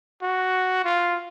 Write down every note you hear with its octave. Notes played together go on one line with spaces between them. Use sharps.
F#4
F4